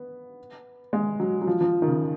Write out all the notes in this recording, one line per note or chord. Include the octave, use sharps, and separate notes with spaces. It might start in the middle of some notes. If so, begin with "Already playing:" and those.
Already playing: B3
G#3
F#3
F#3
F3
F3
D#3
C#3